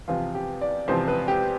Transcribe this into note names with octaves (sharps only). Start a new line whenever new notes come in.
E2 C3 F3 F4
G4
D5
E2 C3 F3 C5
B4
G4